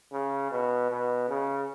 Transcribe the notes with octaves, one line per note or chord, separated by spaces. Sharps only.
C#3
B2
B2
C#3